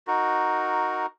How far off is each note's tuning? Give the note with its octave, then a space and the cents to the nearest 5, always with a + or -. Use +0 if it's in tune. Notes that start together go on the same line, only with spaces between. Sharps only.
D#4 +0 F#4 +0 A#4 +0